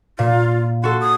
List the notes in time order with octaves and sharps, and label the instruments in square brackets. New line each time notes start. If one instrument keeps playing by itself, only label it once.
[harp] A#2 [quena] F4
[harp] F#4 A4 [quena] C6
[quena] D#6